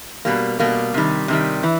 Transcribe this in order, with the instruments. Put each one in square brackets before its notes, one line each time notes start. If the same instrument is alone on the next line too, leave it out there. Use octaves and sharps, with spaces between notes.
[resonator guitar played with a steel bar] B2 G3 A#3
B2 G3 A#3
C3 D#3 G3
C3 D#3 G3
E3